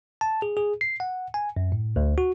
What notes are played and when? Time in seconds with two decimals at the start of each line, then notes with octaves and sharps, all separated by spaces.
0.21 A5
0.42 G#4
0.57 G#4
0.81 C7
1.00 F#5
1.34 G#5
1.57 F#2
1.72 A2
1.96 D2
2.18 F#4